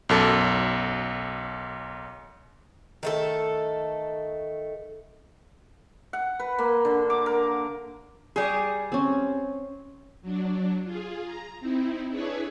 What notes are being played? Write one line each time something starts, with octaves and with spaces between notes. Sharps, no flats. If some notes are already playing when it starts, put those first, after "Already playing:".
B1 F#2 A4
D#3 A3 A4
F#5
B4
A#3
D3
D6
A#4
G3 G#4
C4 C#4
F#3 D4
F4 G#4
A#5
C4 D#4 E4
D4 E4 G#4 B4 C#5